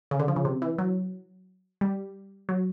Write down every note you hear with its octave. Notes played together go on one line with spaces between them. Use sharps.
C#3
D3
F3
C#3
C3
E3
F#3
G3
F#3